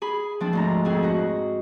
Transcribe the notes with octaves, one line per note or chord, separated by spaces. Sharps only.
G#4 B5
F3 C4 D4
D2 G#2 A#5
F2 C4 G#4
D#4 F#4